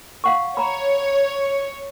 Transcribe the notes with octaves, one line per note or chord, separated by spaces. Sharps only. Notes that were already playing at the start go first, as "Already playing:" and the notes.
F5 F#5 C#6
C#5 A#5 B5